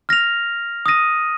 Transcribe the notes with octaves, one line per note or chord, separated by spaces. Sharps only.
F6 A#6 F7
D#6 A#6 D#7